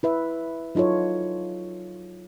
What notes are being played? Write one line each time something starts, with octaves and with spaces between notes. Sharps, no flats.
E4 B4 E5
F#3 D#4 F4 A4 C#5